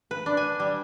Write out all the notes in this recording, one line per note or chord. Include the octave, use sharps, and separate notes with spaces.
B4
D4
G#5
G3